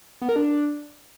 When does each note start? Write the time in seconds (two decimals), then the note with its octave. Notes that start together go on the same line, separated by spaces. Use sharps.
0.21 B3
0.29 A#4
0.36 D4